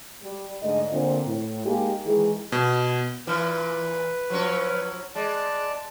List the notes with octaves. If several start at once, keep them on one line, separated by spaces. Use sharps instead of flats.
G3
G#2 D3 A3 D#5
A#2 D3 C4
A2
G#3 A#3 D#4 G4
D#3 E3 G#3 G#4
B2
A#2 E3 B4
F3 F#3 C#4
G#3 D5 A5